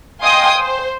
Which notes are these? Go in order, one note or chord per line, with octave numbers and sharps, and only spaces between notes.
D#5 F5 G5 G#5 C6 D#6
C5